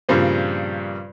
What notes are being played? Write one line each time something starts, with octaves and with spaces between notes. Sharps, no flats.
G2 A#2 C#3 F3 G3 C4